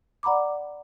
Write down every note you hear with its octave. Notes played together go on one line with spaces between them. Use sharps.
D5 F#5 A#5 B5 D6